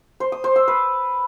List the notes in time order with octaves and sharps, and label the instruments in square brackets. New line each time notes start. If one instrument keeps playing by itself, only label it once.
[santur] C5
D#6
C5
E6
B4